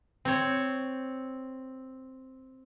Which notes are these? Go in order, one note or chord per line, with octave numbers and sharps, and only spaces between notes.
C4 C#5